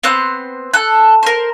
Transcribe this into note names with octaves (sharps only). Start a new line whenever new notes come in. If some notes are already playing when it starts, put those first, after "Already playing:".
B3 C4 C5 F#6
A4 F#6
A#4 C5